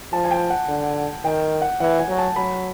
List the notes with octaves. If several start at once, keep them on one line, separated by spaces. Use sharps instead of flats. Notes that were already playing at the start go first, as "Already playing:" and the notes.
F3 A5
G#5
G5
F#5
D3
D#3 G5
F#5
E3 F#5
G#5
F#3
A5
F#3 B5